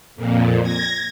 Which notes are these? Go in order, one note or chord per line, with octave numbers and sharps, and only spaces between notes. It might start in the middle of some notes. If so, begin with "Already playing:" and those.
F2 A#2
G#6 A#6